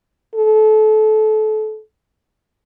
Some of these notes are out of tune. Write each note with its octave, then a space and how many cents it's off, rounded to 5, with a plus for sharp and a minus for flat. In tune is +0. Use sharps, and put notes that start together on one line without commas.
A4 -30